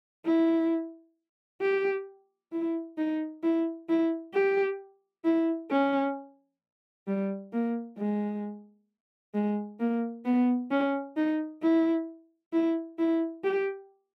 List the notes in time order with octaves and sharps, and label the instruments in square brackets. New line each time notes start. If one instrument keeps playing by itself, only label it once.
[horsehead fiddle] E4
G4
E4
D#4
E4
E4
G4
E4
C#4
G3
A#3
G#3
G#3
A#3
B3
C#4
D#4
E4
E4
E4
G4